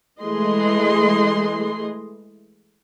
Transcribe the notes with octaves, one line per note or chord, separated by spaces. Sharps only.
E3 G#3 A3 G#4 D#5 C6